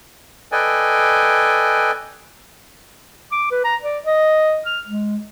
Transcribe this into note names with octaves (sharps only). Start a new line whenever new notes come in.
A4 B4 D5 D#5 G5 G#5
D6
B4
A#5
D5
D#5
F6
G#3